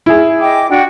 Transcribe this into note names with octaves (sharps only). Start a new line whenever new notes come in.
E4 G#4
D#5 G5 D6
D4 F#4 G5